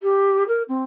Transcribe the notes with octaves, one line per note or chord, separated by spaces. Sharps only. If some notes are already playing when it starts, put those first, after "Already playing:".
G4
A#4
C4